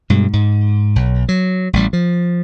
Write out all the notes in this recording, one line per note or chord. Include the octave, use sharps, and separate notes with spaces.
G2 B2 G#3
G#2
B1
F#3
A1 G3
F3